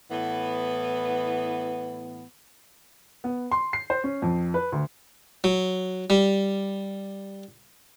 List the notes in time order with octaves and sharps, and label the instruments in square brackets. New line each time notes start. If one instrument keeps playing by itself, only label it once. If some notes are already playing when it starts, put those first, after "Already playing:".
[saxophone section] A2 E3 B3
[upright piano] B3
C6
C7
C5
C#4
F2
B4
D2
[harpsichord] F#3
G3